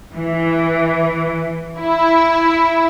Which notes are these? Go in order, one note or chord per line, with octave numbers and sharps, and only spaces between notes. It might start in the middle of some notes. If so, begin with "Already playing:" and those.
E3
E4